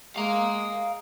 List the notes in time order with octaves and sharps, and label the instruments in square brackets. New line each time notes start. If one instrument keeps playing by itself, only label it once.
[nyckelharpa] G#3 [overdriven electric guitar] F5 A#5